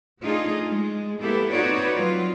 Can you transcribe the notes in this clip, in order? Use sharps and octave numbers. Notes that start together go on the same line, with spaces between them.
A3 D4 D#4 F4 G#4
G#3
A#3 B3 E4 G4 A4
C4 D#4 F#4 B4 C#5 D5
F#3 F4